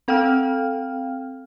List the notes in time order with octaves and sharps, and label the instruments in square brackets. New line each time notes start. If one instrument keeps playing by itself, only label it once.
[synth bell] C4 A4 F5 G5 F6